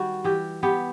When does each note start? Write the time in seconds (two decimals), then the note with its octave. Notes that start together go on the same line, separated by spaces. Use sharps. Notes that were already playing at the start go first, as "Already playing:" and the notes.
Already playing: D#3 G3 F#4
0.24 E3 G4
0.63 B3 G4